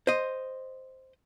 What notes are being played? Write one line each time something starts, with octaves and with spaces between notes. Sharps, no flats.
C5 D#5